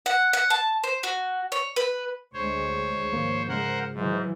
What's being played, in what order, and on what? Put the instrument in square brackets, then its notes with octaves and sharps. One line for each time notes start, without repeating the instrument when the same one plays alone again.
[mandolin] F#5
F#5
A5
C5
F#4
C#5
B4
[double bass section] D2 G#3 [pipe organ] C5 C#5
[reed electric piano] D#2 A#3 [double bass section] G#2 F3
[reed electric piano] C#3 G#3 [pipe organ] A#4 C5 F#5
[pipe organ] G#2 [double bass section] E3 F#3